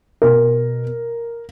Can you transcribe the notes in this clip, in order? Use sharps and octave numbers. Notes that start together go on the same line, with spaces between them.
B2 A#4